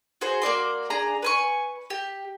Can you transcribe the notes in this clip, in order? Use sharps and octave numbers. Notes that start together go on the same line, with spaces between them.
F#4 G#4 C5
A#3 F#4 D5 C6
D4 G#4 A#5
B4 G#5 C#6
G4